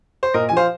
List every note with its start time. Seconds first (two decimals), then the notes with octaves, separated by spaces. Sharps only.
0.23 C5
0.34 A#2 A#4 D#5
0.49 F3 G#5
0.57 C5 F5